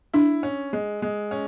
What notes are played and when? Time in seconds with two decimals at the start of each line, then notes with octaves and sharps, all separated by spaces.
0.14 D4 E4
0.43 C#4
0.73 G#3
1.02 G#3
1.31 C#4